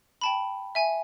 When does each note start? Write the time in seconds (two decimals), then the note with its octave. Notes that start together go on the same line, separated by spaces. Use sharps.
0.21 G5 A5 B5
0.75 E5 G#5